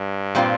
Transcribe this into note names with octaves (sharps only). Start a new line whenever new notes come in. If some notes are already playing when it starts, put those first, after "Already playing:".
Already playing: G2
A#2 G3 C4 F4